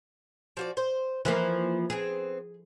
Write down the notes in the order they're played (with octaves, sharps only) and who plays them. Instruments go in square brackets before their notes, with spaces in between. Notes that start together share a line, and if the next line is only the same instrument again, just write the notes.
[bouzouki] F3 F#4 D5
C5
[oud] E3 F3 A#3 [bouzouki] C5
[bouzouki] B3 C4 [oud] G#4